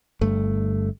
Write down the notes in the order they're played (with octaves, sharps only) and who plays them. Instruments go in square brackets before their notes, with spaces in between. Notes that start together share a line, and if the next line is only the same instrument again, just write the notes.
[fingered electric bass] G1 G2 A3